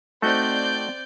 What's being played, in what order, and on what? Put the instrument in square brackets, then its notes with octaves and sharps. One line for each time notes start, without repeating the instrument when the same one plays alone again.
[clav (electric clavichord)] A3 D#4 F#4 [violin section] C4 D5 G6